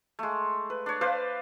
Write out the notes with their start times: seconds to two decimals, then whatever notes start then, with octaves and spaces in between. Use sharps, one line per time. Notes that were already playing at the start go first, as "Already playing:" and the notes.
0.19 G#3 A3
0.70 B4
0.86 D4 C#5
1.01 B4 C5 D5 F5